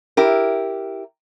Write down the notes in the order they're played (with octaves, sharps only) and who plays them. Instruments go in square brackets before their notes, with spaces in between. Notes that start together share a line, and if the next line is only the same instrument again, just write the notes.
[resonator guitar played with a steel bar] E4 G4 A#4